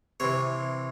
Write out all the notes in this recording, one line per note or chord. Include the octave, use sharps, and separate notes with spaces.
C3 E3 C#5